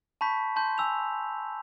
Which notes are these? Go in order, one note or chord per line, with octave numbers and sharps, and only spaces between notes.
A5 B5 C#6 G6 B6
A5 C6 G6
G#5 E6 G6 F7